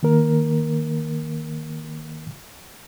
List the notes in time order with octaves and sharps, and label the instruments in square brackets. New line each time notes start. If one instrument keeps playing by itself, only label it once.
[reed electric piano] D#3 A#3 A#4